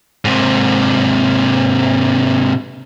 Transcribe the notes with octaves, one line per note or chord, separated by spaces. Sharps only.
G#2 C3